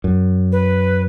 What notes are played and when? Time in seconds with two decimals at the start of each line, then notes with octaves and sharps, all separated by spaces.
0.04 F#2
0.52 B4